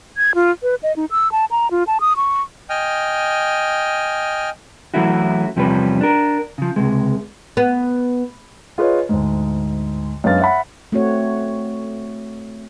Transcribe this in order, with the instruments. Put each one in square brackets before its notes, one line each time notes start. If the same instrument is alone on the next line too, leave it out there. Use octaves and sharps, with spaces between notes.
[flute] G#6
F4
B4
D#5
D#4
E6
A5
A#5
F4
A5
D#6
C#6
[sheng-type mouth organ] D#5 G5 G#5 F6
[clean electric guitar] E3 F#3 A3 C#4 E4 F#4
E2 C3 F3 G3 C#4 B4
D4 A#4
C#3 F3
C#2 C3 G#3
[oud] B3
[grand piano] F4 G#4 B4 C#5 D#5
D2 G#2
F#2 G#3 B3 D4 F5 A6
E5 F#5 B5
[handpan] A3 C4 F#4 C#5